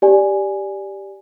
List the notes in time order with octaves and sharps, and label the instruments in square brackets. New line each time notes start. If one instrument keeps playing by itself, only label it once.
[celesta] G4 D5 G#5